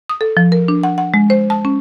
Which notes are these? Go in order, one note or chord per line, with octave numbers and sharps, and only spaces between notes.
D#6
A4
F3
A#4
D4
F#5
F#5
G#3
C5
A5
C#4